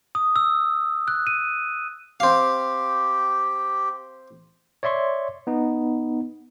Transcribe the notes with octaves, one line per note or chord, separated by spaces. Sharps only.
D#6
E6
F#6
D#7
C4 G4 F5
C#5 D5 E5 C6 C#6
B3 D#4